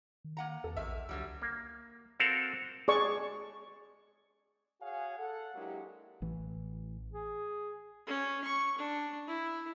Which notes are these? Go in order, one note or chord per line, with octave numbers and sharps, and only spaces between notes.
D#3
A#3 F#5 A#5
E2 A4
A#1 E2 A#4 E5
C#2 D3 F#3 G3
A#3
C4 F#4 A4 A#4 F5 F#5
G#4 D5 C#6
F#4 G#4 C#5 F5 F#5 G#5
A4 F#5
F#3 G#3 A#3 D4 E4 G4
A1 E3
G#4
C#4
C#6
D4
E4